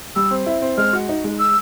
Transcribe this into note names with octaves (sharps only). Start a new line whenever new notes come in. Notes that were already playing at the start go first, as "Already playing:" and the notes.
G3 E6
C4
E4
C4
G#3 F6
F#4
D#4
G#3
E6